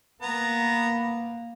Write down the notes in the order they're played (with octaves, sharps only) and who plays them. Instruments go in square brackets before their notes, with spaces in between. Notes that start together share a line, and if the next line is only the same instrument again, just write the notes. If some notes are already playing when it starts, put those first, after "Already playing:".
[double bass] A#3 [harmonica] B3 B4 A#5